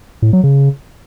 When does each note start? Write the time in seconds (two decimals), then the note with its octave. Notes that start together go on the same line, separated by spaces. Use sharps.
0.22 A2
0.33 F#3
0.44 C#3